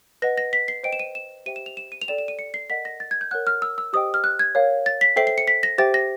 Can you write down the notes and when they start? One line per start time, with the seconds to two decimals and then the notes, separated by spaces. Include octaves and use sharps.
0.22 B4 D#5 F#5 A#6
0.37 A#6
0.53 B6
0.68 C7
0.83 C5 D#5 G5 D7
0.93 E7
0.99 D#7
1.15 E7
1.46 G4 C5 E5 G5 D#7
1.56 E7
1.66 F7
1.77 E7
1.92 D#7
2.02 F7
2.08 A4 D5 G5 E7
2.18 E7
2.28 D#7
2.39 C#7
2.54 C7
2.69 A#4 D#5 F#5 B6
2.85 A#6
3.00 A6
3.11 G#6
3.21 G6
3.31 A#4 C#5 F#5 F#6
3.47 F6
3.62 E6
3.78 E6
3.93 G4 C5 D#5 G5 D#6
4.14 F6
4.24 F#6
4.39 G#6
4.55 A#4 C#5 F5
4.86 A6
5.01 B6
5.16 A4 C5 E5 G5 C7
5.27 C7
5.38 C#7
5.47 B6
5.63 A#6
5.78 G4 C5 E5 G5 A6
5.94 A#6